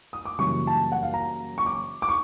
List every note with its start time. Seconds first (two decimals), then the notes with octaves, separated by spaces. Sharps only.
0.13 D#6
0.25 D6
0.39 F#2 C#3 E3 G3 A#3 C#6
0.67 A5
0.92 F#5
1.03 F5
1.14 A#5
1.58 C#6
1.66 D6
2.02 D6
2.09 C#6